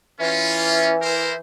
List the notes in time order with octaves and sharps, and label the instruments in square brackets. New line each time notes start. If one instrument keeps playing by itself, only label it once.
[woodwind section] E3 [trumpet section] C#4 F4
[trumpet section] E4 A#4 C5